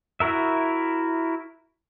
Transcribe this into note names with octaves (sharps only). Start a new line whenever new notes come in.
E4 F#4 A#4 E5